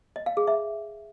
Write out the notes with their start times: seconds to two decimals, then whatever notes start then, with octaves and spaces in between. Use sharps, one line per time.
0.16 D#5
0.26 F5
0.37 G#4
0.47 E5